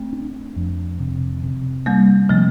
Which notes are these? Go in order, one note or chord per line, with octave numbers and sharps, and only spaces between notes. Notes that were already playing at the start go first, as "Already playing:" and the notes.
Already playing: A3 C4
D4
F2
C3
C3
G3 A#3 D4
C3 F3 A3